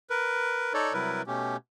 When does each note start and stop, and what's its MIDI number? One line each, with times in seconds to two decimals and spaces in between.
0.10 0.73 70
0.10 0.73 71
0.74 0.93 63
0.74 0.93 69
0.74 0.93 73
0.74 0.93 74
0.93 1.22 48
0.93 1.22 54
0.93 1.22 55
0.93 1.22 64
0.93 1.22 70
0.93 1.22 71
1.27 1.56 47
1.27 1.56 57
1.27 1.56 61
1.27 1.56 67